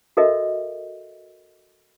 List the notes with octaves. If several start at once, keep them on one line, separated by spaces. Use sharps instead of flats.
F#4 A4 A#4 D#5 E5